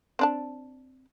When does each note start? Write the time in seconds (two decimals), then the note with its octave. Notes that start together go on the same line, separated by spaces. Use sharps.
0.19 C4 D4 A5